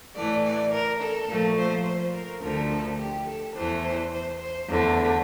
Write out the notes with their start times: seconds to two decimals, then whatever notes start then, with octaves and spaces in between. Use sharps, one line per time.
0.15 A2 E3 A3 D5
0.44 D5
0.72 A#4
1.00 A4
1.29 A#2 F3 A3
1.58 C5
1.85 C5
2.13 A#4
2.42 D2 D3 F3 A3 A#4
2.71 A4
2.99 G4
3.27 A4
3.56 E2 E3 A3 C5
3.84 C5
4.12 C5
4.40 C5
4.69 E2 D3 A3